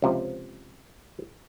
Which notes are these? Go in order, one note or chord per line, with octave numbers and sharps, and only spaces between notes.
C#2 C3 F3